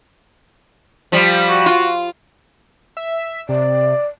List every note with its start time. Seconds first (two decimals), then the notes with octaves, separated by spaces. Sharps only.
1.12 F3 G3
1.49 F#4
1.66 F4
2.97 E5
3.49 C3 D5